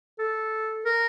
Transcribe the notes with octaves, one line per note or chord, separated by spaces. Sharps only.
A4
A#4